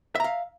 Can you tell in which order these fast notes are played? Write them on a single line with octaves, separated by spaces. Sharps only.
E5 A#5 F5